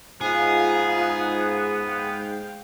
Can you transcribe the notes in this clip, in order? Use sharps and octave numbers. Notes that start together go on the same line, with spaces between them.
G#2 B3 F4 G#4 F5 A#5
G#3 F5 G5